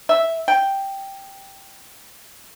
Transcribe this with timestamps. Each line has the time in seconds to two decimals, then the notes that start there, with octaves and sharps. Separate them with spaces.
0.09 E5
0.48 G5